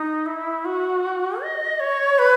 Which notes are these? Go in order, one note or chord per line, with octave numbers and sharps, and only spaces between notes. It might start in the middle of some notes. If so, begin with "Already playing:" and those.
Already playing: D#4
E4
F#4
D#5
C#5
B4